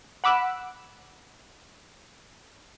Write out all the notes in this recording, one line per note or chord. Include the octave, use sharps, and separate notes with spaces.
F#5 B5 D6 E6 F#6